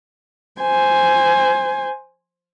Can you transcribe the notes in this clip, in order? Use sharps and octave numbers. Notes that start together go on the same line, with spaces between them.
C5 G#5